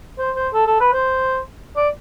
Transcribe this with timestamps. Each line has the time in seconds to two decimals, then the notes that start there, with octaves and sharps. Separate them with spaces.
0.19 C5
0.36 C5
0.53 A4
0.67 A4
0.80 B4
0.93 C5
1.77 D5